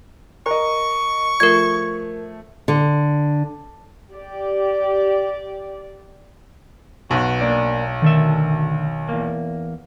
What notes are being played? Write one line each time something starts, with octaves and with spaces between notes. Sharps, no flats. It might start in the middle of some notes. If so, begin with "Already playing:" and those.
A#4 D#5 C#6
F3 A3 A#4 G#6
D3
G4 D5
B1 F#4 B4 F#5
A#3 D4 D5
D2 D#3 A4 E5
E2 A#3